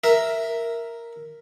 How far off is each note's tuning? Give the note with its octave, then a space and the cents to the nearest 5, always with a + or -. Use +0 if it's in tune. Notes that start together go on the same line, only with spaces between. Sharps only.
A#4 +0 E5 +0